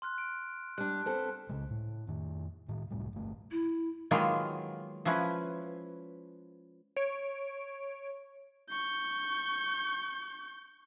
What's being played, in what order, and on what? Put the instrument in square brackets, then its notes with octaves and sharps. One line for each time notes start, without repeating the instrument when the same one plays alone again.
[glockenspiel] C6 F6 F#6
D7
[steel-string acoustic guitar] G3 D4 [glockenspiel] F#6
[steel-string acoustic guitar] B3 C4 A4
[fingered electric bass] C#2 C#3 G#3
A2
F2 D#3
A2 D#3
C2 F#2 A2 G3
G1 A3
[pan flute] E4
[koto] D#3 F#3 G#3 A#3 B3 F4
F3 C#4 E4 B4
[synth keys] C#5 D7
[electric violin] C#6 G6